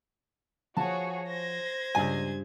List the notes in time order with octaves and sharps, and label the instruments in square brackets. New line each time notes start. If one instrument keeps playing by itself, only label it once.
[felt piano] F3 [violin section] F#4 G#4 C#5 [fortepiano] A5
[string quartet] C5 G#6 [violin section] A#6
[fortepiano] C#2 G#5 [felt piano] G2 D5